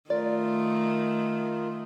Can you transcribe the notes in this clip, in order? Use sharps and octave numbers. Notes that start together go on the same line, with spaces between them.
D#3 A3 F4 A#4 D5